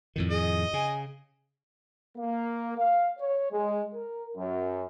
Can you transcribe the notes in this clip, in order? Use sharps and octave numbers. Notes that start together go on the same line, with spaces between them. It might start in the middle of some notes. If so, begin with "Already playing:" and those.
F2 A2 D#3
G#4 D#5
C#3 G#5
A#3
F5
C#5
G#3
A#4
F#2